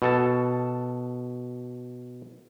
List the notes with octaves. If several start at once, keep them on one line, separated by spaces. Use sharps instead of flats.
B2 A4 A5